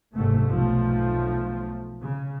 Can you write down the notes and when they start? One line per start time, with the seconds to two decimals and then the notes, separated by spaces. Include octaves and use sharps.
0.14 F#1 G#2 C3 A3
0.49 B1 F3 A3
2.03 C#3